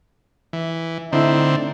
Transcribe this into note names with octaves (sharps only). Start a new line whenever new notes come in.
E3
A2 D3 C4 D#4 E4